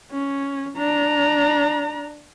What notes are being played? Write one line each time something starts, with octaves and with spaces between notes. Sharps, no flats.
C#4
D4 A#5